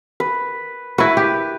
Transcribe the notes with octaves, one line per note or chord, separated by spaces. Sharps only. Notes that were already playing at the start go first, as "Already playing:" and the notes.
B4
E4 F#4 B4
G4